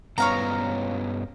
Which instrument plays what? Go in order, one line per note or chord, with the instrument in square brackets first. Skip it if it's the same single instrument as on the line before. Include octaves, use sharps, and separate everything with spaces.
[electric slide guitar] G2 B3 C#4 [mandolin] C#5 F5 A#5